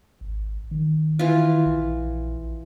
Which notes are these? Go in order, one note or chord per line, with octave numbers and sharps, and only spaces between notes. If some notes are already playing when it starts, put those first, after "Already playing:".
G#1
D#3
E3 F4
A#1